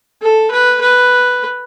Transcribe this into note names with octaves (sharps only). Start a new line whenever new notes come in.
A4
B4
B4